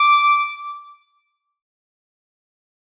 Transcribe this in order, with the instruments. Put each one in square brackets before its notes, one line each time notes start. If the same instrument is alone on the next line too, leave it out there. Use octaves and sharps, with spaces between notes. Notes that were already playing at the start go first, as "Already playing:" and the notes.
Already playing: [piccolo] D6